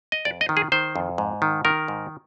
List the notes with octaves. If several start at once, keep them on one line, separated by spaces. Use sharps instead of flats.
D#5
F2 D5
D#5
D#3
G#4
D#3 C5
F2
G#2
D#3
D#3 A#4
G#2